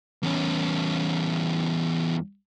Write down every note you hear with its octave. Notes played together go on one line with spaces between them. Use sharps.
E2 C#4